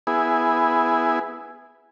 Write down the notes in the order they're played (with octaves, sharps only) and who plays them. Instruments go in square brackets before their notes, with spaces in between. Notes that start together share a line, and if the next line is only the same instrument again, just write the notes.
[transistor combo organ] B3 E4 G#4